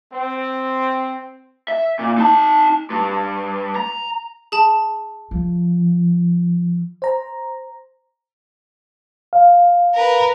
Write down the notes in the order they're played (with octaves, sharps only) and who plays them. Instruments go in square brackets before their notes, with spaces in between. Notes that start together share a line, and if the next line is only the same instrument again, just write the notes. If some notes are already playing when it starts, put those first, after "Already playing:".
[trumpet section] C4
[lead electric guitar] E5
A#2
D#4 A5
G2
A#5
[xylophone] G#4 A5
[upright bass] F3
[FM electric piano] C5 A#5
[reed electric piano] F5
[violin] A#4 B4